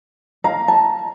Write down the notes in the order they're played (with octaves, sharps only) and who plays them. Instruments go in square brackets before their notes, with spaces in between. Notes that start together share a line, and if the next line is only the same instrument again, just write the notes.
[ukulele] F5 [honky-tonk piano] A#5
[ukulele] A5